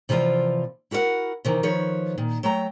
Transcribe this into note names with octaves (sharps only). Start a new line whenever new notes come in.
C3 E3 F3 F4 D5
E4 F#4 A#4 C#5 F#5
C3 D#3 E3
D#3 F3 B4 C#5
A#2 D#3
F#3 A3 G5 A#5